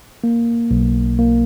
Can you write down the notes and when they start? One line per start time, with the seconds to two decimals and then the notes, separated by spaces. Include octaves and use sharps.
0.24 A#3
0.71 B1
1.19 A#3